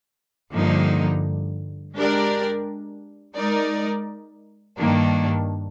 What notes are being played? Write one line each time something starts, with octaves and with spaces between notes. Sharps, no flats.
G2 D3 F3 A#3 D#4
G#3 D4 G4 A#4 D5
G#3 D#4 A#4 D5
G2 D#3 A#3 D4